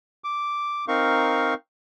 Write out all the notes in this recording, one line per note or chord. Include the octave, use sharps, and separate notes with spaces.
D6
C4 D#4 A#4 F5 C#6